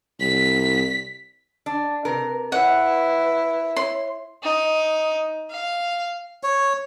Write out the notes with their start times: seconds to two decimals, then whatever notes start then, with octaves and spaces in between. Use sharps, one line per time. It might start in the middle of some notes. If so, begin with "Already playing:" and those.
0.20 C2 B6
1.66 D4
2.05 C3 A#4 B4
2.52 E4 B4 C#5 F#5
3.76 C#5 C6
4.44 D#4
5.51 F5
6.43 C#5